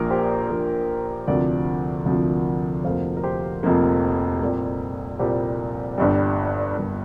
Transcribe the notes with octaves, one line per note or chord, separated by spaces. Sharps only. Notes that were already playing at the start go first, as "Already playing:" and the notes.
Already playing: A#1 A#2 A#3 A#4
G4 C5
A#1 A#2 A#3
D2 C3 F3 A#4 D5
D2 C3 F3
F1 F2 F3 A#3 C5 F5
A#4
G4 C5
F1 F2 F3 A#3
C2 A#2 G3 A#3
C2 A#2 G3 A#3 G4 C5
G1 G2 G3
G1 G2 G3 A#4